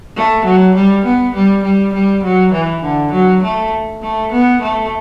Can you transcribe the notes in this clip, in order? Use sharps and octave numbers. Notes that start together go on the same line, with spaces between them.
A3
F#3
G3
B3
G3
G3
G3
F#3
E3
D3
F#3
A3
A3
B3
A3